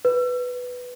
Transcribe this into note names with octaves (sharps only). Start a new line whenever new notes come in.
B4